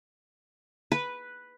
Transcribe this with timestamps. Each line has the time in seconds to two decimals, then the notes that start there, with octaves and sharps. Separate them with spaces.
0.92 B4